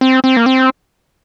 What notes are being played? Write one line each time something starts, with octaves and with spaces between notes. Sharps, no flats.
C4
C4
A#3
C4